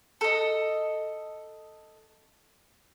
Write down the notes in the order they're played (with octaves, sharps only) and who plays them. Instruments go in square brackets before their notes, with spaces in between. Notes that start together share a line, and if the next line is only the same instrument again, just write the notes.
[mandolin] A4 D#5